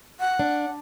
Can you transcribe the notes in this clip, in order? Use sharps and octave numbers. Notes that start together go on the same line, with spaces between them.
F#5
D4